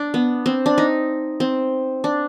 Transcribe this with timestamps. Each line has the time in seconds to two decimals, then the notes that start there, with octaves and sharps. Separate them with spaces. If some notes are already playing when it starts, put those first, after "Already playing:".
Already playing: D4
0.14 B3
0.46 C4
0.66 D4
0.78 D#4
1.40 C4
2.04 D4